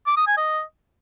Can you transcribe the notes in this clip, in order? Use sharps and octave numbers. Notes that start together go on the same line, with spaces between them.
D6
D#6
G#5
D#5